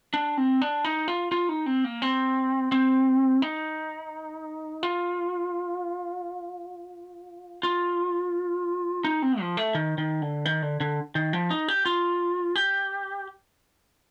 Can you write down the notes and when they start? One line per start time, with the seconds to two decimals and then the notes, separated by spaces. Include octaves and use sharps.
0.14 D4
0.37 C4
0.62 D4
0.84 D#4
1.08 F4
1.32 F4
1.49 D#4
1.66 C4
1.84 A#3
2.02 C4
2.72 C4
3.42 D#4
4.83 F4
7.63 F4
9.04 D#4
9.22 C4
9.40 F3
9.57 A3
9.75 D#3
9.98 D#3
10.22 D3
10.45 D#3
10.62 D3
10.80 D3
11.15 D#3
11.33 F3
11.50 D#4
11.68 G4
11.86 F4
12.56 G4